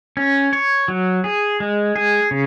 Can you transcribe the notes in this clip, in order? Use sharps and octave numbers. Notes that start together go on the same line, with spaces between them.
C#4
C#5
F#3
G#4
G#3
G#4
C#3